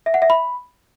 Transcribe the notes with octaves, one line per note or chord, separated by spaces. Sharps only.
E5
F#5
E5
B5